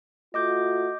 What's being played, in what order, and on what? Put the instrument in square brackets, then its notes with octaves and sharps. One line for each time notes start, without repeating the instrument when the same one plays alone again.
[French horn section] A3 F4 F#4 [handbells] D#5 D6 G6